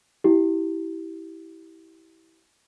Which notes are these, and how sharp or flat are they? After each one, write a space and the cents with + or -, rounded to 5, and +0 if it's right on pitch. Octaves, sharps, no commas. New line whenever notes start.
E4 -15 G4 -15